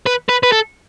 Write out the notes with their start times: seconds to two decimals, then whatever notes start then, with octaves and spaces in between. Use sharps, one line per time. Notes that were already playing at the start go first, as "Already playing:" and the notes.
0.06 B4
0.29 B4
0.43 B4
0.52 A4